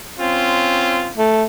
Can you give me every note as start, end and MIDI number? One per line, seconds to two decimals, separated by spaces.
0.20 1.12 60
0.20 1.12 61
0.20 1.12 65
1.17 1.44 57